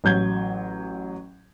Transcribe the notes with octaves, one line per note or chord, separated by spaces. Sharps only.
A1 F#3 G6 G#6